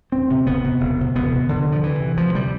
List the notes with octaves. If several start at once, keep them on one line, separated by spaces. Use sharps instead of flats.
E1 C4
D2 C3
E1 B3
D2 C3
E1
D2 C3
E1 B3
D2 C3
D2 D3
C3
F3
D2 E3
C3
D2 F3
C3 G3